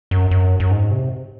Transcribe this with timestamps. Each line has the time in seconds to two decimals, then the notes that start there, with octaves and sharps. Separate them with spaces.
0.11 F#2
0.31 F#2
0.60 F#2
0.71 G#2
0.91 C3